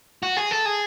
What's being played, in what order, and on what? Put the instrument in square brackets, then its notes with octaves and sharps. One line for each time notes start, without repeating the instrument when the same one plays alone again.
[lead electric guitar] F#4
G#4
A4
G#4